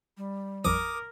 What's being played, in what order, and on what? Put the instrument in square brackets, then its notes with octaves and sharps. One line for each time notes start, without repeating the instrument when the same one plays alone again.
[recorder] G3
[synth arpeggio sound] A1 F2 F3 [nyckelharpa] A#4 [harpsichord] D6 D#6